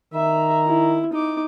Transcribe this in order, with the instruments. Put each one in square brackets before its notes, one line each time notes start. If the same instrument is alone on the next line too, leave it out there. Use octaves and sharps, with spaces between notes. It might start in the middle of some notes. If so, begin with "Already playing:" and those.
[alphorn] D#3 [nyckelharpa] E5 [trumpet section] A#5
[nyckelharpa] E4
D#4 D6